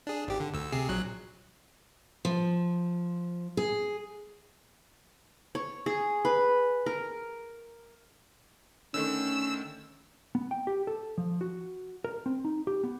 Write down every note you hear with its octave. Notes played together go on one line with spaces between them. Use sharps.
D4 G#4
G#1 G4
D3
D2 E6
C3 G#4 C7
A#1 F#3 F#6
F3
G#4
C#5
G#4
B4
A#4
D3 D#3 A3 C#4 E6
B3
G5
G4
A4
F3
F#4
A#4
C4
D#4
G4
B3